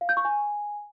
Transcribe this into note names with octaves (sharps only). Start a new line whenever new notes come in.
F5
G6
C#6
G#5